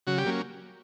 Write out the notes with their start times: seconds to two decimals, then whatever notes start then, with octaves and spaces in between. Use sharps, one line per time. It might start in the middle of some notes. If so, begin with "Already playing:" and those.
0.07 C#3 F#3 F#4
0.18 G3 G4
0.25 F#3 A#3 C#4